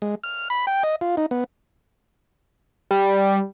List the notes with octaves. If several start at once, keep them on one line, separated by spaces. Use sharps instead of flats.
G#3
F6
B5
G5
D#5
F4
D#4
B3
G3